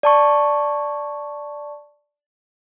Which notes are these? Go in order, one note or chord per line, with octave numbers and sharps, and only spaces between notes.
D5 A5 C#6